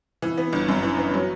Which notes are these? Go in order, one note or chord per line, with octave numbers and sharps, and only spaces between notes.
E3
B3
G1
F#2
E3
B3
F#3